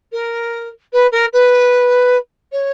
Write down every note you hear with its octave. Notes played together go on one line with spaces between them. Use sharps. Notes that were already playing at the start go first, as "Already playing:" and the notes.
A#4
B4
A#4
B4
C#5